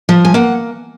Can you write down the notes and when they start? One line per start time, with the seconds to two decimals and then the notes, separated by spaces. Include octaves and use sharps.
0.09 F3
0.25 G#5
0.34 A#3 F#5